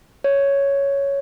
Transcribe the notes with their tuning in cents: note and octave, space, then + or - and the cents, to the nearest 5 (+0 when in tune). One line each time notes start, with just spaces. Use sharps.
C#5 +5